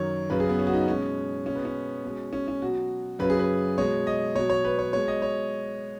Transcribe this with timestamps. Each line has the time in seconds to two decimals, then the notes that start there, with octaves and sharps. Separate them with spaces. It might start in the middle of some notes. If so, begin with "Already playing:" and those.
Already playing: F#2 D#3 F#3 C#5
0.30 F#2 C#3 F#3 B4
0.40 G#4
0.49 B3
0.59 C#4
0.67 F#4
0.74 D#4
0.88 B2 G#3 C#4
1.45 B2 G#3 C#4
1.55 B3
1.65 C#4
2.04 B2 G#3
2.33 C#4
2.48 C#4
2.62 B2 F#3 F#4
3.19 F#2 C#3 F#3 B4
3.30 G#4
3.39 B4
3.78 B2 G#3 C#5
4.07 D#5
4.35 B2 F#3 C#5
4.50 C#5
4.65 B4
4.79 C#5
4.93 B2 G#3 C#5
5.08 D#5
5.22 C#5